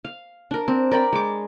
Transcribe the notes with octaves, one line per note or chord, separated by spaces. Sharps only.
F5
D4 A#4
C4
A#4 D5 G5 B5
G#3 D6